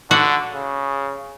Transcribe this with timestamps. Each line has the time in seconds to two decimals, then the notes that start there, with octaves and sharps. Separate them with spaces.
0.11 D3 F#4
0.53 C#3